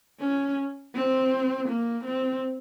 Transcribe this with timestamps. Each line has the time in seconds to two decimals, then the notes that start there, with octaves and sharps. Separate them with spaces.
0.20 C#4
0.95 C4
1.68 A#3
2.04 C4